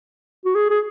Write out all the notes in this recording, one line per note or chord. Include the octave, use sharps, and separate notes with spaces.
F#4
G#4
G#4